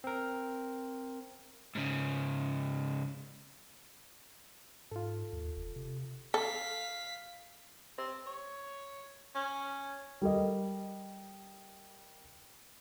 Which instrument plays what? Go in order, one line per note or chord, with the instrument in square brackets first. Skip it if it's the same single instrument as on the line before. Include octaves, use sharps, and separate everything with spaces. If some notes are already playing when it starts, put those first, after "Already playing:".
[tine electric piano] C4 A#4
[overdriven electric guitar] G#2 C#3
[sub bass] G#2 [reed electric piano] F4 A4
[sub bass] D#2
F1
C3
[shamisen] A4 [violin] F5 B6
[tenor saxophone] C4
C#5
C#4
[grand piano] G3 A4 A#4 D#5